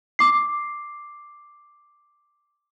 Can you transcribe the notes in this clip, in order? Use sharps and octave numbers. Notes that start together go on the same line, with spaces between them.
D6 C7